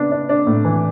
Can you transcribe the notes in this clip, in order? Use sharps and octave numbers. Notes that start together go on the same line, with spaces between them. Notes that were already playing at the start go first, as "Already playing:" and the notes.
Already playing: C#3 B3 D4
D4
D4
A2
E3